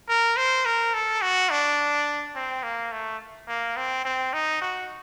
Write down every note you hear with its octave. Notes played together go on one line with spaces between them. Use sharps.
A#4
C5
A#4
A4
F#4
D4
C4
A#3
A3
A#3
C4
C4
D#4
F#4